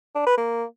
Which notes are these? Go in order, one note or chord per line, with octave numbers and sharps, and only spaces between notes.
D4
B4
A#3